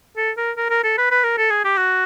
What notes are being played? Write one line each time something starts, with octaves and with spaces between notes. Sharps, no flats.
A4
A#4
A#4
A#4
A4
B4
B4
A#4
A4
G#4
G4
F#4